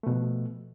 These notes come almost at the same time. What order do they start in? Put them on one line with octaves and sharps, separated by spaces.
A3 B2 F3